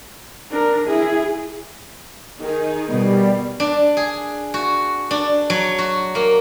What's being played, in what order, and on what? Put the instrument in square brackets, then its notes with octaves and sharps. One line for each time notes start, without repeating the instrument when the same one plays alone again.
[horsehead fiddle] D4 A#4
E4 G#4
[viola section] D#3 D#4 G#4
[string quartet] B2 [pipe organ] G3
[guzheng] D4
G#4
F#4
D4
F#3
F#4
A#3